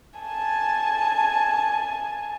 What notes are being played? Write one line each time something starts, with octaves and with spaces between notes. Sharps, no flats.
G#5 A5